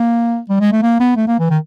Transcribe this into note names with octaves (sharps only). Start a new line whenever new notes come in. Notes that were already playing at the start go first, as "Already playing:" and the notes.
Already playing: A#3
G3
G#3
A3
A#3
B3
A3
A#3
E3
D#3